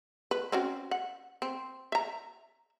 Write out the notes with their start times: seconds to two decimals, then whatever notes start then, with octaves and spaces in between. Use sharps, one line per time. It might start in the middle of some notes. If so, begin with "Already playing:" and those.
0.31 B4
0.52 C4 C#4 F#4
0.91 F#5
1.42 C4
1.92 E5 A#5